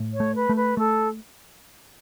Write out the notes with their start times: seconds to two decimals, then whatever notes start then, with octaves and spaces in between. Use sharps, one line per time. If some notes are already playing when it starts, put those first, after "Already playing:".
Already playing: A2
0.13 C#5
0.20 A3
0.35 B4
0.49 A3
0.56 B4
0.77 A3 A4